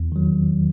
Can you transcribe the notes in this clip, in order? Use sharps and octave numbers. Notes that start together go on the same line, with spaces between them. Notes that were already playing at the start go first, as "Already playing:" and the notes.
Already playing: E2
D#3 F#3